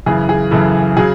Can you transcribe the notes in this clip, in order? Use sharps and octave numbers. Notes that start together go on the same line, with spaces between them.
F#2 C#3 E3 G#4
G#4
F#2 C#3 E3 A4
C#3 F#3 G#4